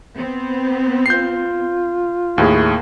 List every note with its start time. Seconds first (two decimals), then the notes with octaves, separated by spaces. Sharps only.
0.16 B3 C4
1.06 F4 G6 C7
2.38 D#2 A2 A#3 G#4